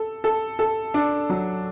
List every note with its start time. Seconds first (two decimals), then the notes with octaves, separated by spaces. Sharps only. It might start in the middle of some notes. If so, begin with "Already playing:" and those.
Already playing: A4
0.24 A4
0.59 A4
0.94 D4
1.30 F#3